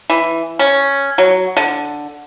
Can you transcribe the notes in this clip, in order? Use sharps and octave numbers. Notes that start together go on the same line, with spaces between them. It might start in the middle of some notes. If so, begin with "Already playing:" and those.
E3
C#4
F#3
D3